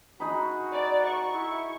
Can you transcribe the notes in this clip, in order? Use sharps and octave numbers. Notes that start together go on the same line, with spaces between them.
D#4 F#4 G#4 B5
D5
C#6
E4